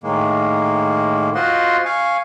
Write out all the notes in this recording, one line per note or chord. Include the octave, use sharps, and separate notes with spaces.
A2 D#3 G#3 A#3
F4 F#4 C5 D#5 F#5 C6
F5 G#5 C#6